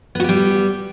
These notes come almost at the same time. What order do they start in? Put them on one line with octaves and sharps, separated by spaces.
B3 F#4 G4 G3